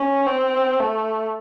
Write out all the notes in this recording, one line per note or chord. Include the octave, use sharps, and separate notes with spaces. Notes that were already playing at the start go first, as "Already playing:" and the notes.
Already playing: C#4
C4
A3